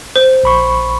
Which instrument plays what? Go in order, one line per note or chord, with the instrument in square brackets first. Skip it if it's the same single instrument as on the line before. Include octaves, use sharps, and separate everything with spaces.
[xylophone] C5
[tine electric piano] A#1 B5 C#6